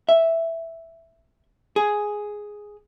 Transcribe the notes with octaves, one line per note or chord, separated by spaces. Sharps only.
E5
G#4